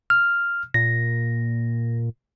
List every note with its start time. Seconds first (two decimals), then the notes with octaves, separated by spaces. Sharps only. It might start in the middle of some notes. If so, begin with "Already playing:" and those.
0.10 F6
0.74 A#2 A#6